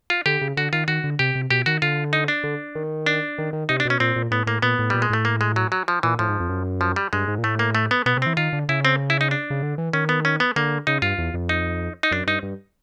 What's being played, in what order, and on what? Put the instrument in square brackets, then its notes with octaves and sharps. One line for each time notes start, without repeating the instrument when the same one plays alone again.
[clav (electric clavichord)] F4
[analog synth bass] D3 [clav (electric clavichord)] G4
[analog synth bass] C#3
[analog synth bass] D3 [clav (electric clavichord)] F#4
[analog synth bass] D#3 [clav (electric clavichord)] F4
[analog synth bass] D#3 [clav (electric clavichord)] F#4
[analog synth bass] D3
[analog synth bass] C3 [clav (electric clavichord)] G4
[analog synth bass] C3
[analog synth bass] B2 [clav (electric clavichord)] G4
[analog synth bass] D#3 [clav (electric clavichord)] F#4
[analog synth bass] D3 [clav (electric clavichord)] F4
[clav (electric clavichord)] D#4
D4
[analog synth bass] D3
D#3
[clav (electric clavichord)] D4
[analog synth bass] D#3
D#3
[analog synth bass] C3 [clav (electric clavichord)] D#4
[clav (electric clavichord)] D4
[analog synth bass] B2 [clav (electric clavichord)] C#4
[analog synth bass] A#2 [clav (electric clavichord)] C4
[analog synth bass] A#2
[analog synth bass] A2 [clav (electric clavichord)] B3
[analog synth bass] A2 [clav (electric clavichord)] A#3
[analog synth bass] A#2 [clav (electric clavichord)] B3
[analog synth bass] A2
[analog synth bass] A#2 [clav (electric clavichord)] G3
[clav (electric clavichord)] G#3
[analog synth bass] A2 [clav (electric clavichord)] A3
[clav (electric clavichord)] A#3
G#3
F#3
F#3
F3
[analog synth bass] A#2 [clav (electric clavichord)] E3
[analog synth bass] A2 [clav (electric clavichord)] F3
[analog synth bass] G#2
F2
F#2
[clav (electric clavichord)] F3
G3
[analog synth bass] G2 [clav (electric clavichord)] G#3
[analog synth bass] G#2
A#2
[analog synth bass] A2 [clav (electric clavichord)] A3
[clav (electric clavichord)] A#3
A3
B3
[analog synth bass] B2 [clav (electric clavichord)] B3
[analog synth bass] C3
[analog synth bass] E3 [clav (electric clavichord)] C4
[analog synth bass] D#3 [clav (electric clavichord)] F4
[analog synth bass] D3
[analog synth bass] C#3 [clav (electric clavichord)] E4
[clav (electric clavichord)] C4
E4
D#4
D4
[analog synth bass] C#3
D3
E3
[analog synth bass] D#3 [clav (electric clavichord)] C#4
[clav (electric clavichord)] B3
C#4
B3
[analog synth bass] D3 [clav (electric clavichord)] A#3
[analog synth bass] C#3 [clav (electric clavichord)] D#4
[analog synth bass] G2 [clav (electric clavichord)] F4
[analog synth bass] E2
F2
[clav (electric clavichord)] D#4
D#4
[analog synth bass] F#2 [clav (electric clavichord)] D4
[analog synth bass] G2 [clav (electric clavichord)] D#4
[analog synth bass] G2